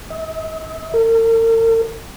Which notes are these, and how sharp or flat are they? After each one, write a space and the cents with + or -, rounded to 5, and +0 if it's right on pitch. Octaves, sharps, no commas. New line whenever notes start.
E5 -45
A#4 -45